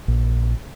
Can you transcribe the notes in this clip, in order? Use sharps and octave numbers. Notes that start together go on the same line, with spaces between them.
A#1